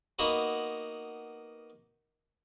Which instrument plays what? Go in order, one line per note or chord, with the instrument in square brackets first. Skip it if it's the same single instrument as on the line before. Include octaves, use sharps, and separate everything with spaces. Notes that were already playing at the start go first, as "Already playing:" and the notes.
[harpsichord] A#3 B3 D#4 F#4 B4